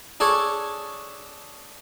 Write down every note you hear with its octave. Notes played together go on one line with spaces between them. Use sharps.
D4 G#4 A4 C#5